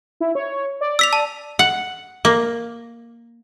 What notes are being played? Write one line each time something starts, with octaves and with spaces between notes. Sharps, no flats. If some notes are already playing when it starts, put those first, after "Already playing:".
E4
C#5
D5
E6 B6 F7
A5
F#5
A#3